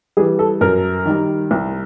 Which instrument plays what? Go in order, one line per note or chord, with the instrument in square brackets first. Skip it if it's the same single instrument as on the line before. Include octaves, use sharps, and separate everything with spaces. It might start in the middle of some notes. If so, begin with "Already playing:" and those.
[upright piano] E3 G3 G#4
A4
F#2 A#4
D#3 G3
C2